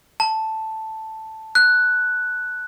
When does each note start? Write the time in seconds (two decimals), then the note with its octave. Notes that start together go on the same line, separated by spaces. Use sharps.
0.20 A5
1.55 F#6